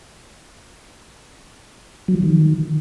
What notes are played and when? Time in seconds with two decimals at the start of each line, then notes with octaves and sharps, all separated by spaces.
2.08 F#3
2.15 F3
2.23 D#3